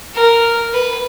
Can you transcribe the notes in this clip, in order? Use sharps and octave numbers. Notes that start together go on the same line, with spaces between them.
A#4
B4